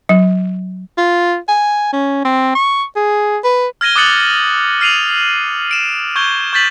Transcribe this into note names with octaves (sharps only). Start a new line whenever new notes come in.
F#3
F4
G#5
C#4
C4
C#6
G#4
B4
F6 G#6 A#6 D#7 G7
D6 D#6 F#6 A6 C#7 F#7
F6 C7 D#7 F7 F#7
D7 E7
C#6 G6 G#6 G7
C#6 G6 A6 B6 F#7